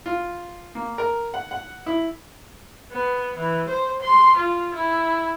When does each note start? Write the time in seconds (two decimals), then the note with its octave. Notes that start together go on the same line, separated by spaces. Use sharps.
0.06 F4
0.75 A#3
0.98 A#4
1.34 F#5
1.51 F#5
1.86 E4
2.91 B3
3.36 E3
3.68 C5
4.02 C6
4.37 F4
4.75 E4